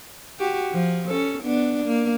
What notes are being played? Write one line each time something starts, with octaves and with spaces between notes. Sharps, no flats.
F#4 G4
F3
C#4 A4
B3 D4
A#3